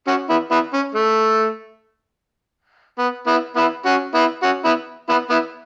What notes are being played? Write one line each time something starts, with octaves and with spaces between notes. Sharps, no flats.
C#4 F#4
B3 E4
B3 E4
C#4
A3
B3
B3 E4
B3 E4
C#4 F#4
B3 E4
C#4 F#4
B3 E4
B3 E4
B3 E4